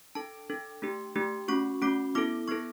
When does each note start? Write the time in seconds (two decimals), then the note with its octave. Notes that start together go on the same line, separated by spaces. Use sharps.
0.15 D4 A4 A5
0.50 D4 A4
0.82 A3 D4 G4
1.16 A3 D4 G4
1.48 A3 C#4 F#4 C#6
1.82 A3 C#4 F#4 D6
2.15 B3 E4 A4 D6
2.48 B3 E4 A4 C#6